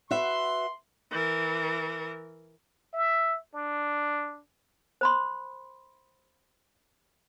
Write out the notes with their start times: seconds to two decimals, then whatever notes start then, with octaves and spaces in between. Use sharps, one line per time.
0.11 F#4 B4 E5 C6
1.11 E3 A#4
2.93 E5
3.54 D4
5.01 C5 B5 C6